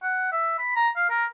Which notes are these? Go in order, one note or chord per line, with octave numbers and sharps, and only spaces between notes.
F#5
E5
B5
A#5
F5
A#4